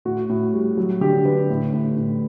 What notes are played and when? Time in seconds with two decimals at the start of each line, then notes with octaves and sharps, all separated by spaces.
0.05 A2 F#4
0.29 A2
0.53 G3
0.77 F#3
1.01 D3 G4
1.25 D3 B4
1.50 A2
1.73 A2
1.97 A2